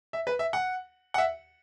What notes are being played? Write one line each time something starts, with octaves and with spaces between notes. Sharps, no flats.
E5
B4
E5
F#5
F#5
E5